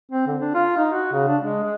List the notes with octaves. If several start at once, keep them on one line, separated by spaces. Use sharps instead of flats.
C4
D3
D4
F4
D#4
F#4
C#3
D4
G#3
G#3